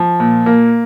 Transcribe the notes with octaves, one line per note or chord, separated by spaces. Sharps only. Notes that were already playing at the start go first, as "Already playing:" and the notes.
Already playing: F3
A#2
A#3